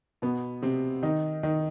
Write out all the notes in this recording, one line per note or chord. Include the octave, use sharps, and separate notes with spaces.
B2 B3
C3 C4
D#3 D#4
D#3 D#4